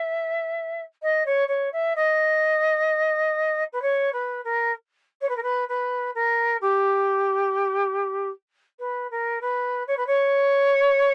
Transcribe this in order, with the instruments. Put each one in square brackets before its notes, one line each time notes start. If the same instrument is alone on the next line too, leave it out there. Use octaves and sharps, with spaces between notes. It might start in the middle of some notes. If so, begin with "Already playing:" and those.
Already playing: [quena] E5
D#5
C#5
C#5
E5
D#5
B4
C#5
B4
A#4
C#5
B4
A#4
B4
B4
A#4
G4
B4
A#4
B4
C#5
B4
C#5